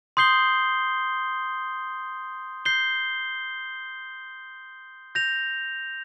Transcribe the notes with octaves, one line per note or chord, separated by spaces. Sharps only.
C6 D#6 G6 C7 G7
G6 C7 G7
G6 A#6 F7